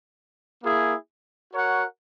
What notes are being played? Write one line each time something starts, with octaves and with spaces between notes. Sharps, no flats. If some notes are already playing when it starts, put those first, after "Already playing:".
A#3 E4 G#4
F#4 A#4 C#5 F#5